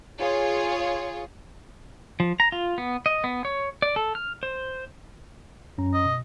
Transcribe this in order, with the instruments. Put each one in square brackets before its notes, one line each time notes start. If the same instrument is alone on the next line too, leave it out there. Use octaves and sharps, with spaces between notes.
[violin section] F4 G#4 C#5
[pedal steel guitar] F3
A#5
F4
B3
D#5
B3
C#5
D5
A4
F6
C5
[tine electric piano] F#2 C#4 A#5
[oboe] D#5
[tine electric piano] B2